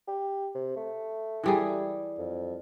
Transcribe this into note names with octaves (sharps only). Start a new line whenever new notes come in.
G4
C3
A3
E3 G3 G#4
F2